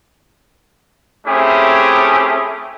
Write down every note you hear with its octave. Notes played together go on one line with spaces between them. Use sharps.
A3 C4 C#4 E4 G4 G#4